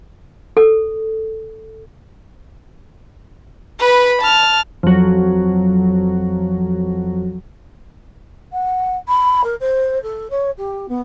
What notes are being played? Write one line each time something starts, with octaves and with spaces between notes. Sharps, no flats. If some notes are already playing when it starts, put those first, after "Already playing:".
A4
B4 B5
A5 F6
F2 F#3
F#5
B5
A#4
C5
A4
C#5
G4
B3